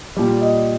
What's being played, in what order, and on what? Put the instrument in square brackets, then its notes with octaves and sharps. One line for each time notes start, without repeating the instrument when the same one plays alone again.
[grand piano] A#2 G3
D#5